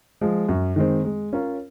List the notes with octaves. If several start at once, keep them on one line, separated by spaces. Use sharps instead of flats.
F3 G#3
F#2
D#3 G#3 C4
G#3
C#4 F4 A#4 C#5